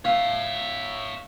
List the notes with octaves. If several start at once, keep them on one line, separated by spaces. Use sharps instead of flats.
C#5 E5 F5